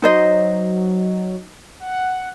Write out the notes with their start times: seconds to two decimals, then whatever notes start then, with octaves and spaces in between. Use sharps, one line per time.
0.02 F#3 D#4 C5 D#5
1.80 F#5